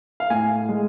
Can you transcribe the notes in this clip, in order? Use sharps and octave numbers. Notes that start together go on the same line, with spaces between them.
F5
A2 G#5
G#3